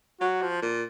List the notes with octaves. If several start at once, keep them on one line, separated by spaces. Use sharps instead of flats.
F#3 F#4
F3
A#2